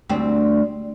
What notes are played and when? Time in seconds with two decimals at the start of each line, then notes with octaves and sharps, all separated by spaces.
0.09 D2 G3 C4